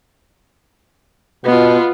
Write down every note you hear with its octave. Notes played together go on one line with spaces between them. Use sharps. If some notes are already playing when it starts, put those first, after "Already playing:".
B2 B3 F4